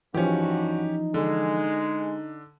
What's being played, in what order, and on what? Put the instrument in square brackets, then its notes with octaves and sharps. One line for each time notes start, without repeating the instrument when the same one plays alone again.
[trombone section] G2 F#4 [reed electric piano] E3 F3 [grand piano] C#4 G4 [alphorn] D#4
[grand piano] D3 [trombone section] G#3